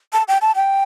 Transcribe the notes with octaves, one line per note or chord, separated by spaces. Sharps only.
A5
G5
A5
G5